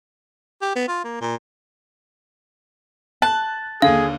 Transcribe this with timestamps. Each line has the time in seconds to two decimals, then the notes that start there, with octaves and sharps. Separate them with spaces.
0.62 G4
0.75 B3
0.88 F4
1.04 A#3
1.21 A#2
3.22 A5 F#6
3.82 D#2 D3 G#4 F5